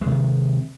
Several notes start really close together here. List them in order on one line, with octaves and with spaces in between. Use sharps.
G#3 C3 D#3